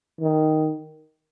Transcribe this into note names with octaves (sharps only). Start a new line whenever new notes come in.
D#3